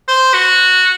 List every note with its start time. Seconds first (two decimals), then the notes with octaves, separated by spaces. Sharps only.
0.08 C5
0.34 F#4